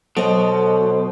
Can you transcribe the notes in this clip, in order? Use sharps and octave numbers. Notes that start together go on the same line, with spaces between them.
B2 F#3 A4 C5 D#5